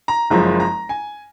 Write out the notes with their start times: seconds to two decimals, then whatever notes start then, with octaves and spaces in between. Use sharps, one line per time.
0.08 A#5
0.30 F#1 F#2 F3 G#3 A#5
0.60 A#5
0.89 G#5